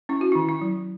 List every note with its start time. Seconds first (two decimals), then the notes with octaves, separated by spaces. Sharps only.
0.09 C#4 E4
0.21 F#4
0.32 D#3 E4
0.49 E4
0.61 F#3